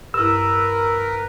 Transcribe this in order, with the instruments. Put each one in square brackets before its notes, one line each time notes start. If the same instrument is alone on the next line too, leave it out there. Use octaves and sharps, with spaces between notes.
[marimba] G2 E4 [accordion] A#4 B4 [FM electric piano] E6